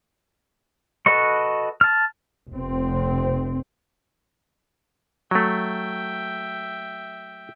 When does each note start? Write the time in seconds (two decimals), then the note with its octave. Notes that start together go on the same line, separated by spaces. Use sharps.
1.06 F#4 A4 B4 D#5 C#6
1.81 A5 F6
2.51 F1 C4
5.31 F#3 A3 E5 G5